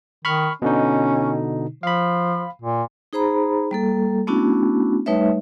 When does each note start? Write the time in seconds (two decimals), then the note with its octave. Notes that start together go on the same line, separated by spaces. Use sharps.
0.25 D#3 B5 C#6 F6
0.62 B2 D3 C#4 D#4
1.83 F3 F5 B5
2.62 A#2
3.13 D#4 G#4 C5 A#5 B5
3.71 G3 A#3 A4
4.27 A3 B3 C#4 D4 E4 F#4
5.06 G3 A3 D#4 B4 C#5 E5